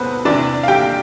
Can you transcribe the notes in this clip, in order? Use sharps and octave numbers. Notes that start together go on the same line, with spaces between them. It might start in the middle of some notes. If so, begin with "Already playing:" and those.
Already playing: E1 C3 B3 B4 C5
E2 C3 E3 D4 D5
F5
G4 G5